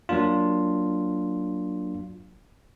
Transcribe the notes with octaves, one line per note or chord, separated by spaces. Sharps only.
F#3 A#3 D4 F4